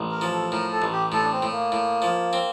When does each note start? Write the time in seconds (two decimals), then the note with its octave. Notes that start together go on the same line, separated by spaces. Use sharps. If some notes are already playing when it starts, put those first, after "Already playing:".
Already playing: A1
0.11 A#4
0.21 F3
0.32 A4
0.52 A2 A#4
0.72 A4
0.82 A1
0.92 G4
1.12 A2 A4
1.22 D4
1.32 C4
1.42 A2
1.52 A#3
1.72 A2
2.02 F3
2.33 C4